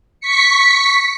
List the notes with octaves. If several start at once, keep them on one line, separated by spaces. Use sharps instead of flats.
C#6 B6 C#7